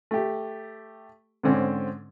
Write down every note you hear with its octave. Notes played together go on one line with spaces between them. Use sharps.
A3 G4
G#2 D3 C4 C#4